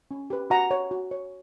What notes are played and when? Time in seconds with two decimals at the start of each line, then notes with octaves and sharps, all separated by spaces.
0.11 C#4
0.30 G4 B4
0.50 F#4 F#5 A#5
0.71 C#5
0.91 F#4
1.11 C#5